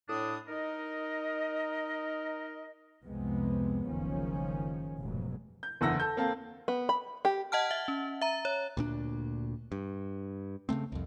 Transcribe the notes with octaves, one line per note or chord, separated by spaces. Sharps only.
A2 D4 D#6
D#4 A#4 D#5
C2 F2 C3 G#3 B3 C4
F#1 C#2 D#3 F3 C#4
F1 G#2 B2 F#3
G6
F#1 E2 D3 F#5 E6 A#6
A4 G6
A#3 C4 A4 F5
B3
B5
G4
D#5 F#5 A5 F6
E5
C#4
E5 A#5
C#5
D2 A#2 D4
G2
C#3 E3 A3 C4
C2 F2